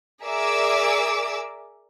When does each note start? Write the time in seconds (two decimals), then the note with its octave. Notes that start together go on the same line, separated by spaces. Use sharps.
0.23 G#4 A#4 D5 E5 D6 E6